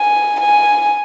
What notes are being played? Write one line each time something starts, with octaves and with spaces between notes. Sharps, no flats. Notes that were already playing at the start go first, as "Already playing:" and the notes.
Already playing: G#5
G#5